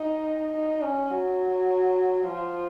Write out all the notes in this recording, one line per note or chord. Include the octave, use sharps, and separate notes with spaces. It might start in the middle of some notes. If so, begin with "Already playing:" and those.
Already playing: D#4
D#4
C#4
F#3
F3